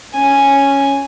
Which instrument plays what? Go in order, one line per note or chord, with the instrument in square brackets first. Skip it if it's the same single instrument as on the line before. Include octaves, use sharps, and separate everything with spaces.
[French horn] C#4 [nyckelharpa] G#5